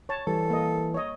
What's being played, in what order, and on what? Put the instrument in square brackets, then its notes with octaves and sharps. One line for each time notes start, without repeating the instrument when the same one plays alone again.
[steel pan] C#5 A5
[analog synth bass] E3 [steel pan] G3 [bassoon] A4
[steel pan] A#3 D#5
C#5 D#5